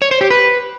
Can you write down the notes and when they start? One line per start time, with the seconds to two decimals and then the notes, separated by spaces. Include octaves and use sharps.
0.02 C#5
0.11 C5
0.21 G4
0.30 B4